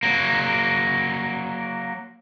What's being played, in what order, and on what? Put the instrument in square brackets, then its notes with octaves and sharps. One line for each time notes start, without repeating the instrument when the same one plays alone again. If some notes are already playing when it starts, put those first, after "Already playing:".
[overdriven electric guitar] F#3 A#3